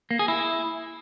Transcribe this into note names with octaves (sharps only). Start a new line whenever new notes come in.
A#3
G#4
E4